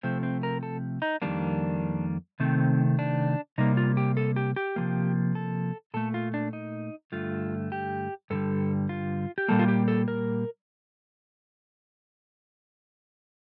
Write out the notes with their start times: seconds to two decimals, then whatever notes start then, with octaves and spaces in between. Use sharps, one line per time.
0.03 C3 F3 A3 C4
0.23 C4
0.43 A#4
0.63 A4
1.02 D#4
1.22 F2 D#3 G3 A#3 D4
2.40 C3 D#3 A3 C4
2.99 D4
3.58 C3 G3 A#3 D#4
3.77 F4
3.97 G4
4.17 A4
4.36 G4
4.56 G4
4.76 C3 F3 A#3
5.35 A4
5.94 A#2 A3 A4
6.14 F4
6.34 D4
6.53 D#4
7.12 G2 D3 A3 F4
7.72 G4
8.30 G2 D3 G3 A4
8.89 F4
9.38 G4
9.48 A#2 G3 A#3 A4
9.59 F4
9.68 G4
9.88 A4
10.08 A#4